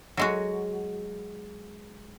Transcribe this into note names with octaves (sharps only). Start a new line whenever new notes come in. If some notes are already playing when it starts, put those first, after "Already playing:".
F#3 G#3 F#4